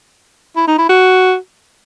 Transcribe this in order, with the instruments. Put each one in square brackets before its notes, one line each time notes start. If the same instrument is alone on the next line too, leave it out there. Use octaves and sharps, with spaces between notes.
[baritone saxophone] E4
D#4
E4
F#4